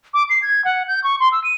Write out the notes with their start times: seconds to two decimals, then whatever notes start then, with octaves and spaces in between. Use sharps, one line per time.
0.14 D6
0.30 C7
0.42 G#6
0.65 F#5
0.88 G6
1.04 C#6
1.20 C6
1.32 E6
1.44 D#7